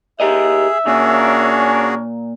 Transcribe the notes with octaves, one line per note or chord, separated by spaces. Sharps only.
G4 G#4 A#4 D#5 E5
A#2 C#4 D4 F#4 G#4 A#4 C#5